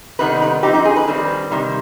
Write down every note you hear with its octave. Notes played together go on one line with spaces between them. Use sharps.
C3 D#3 G3 B3 D#4 B4
B4
F3 C4 D#4 G4
D#4
G#4
B4
D#3 G3 C4
C3 D#3 G3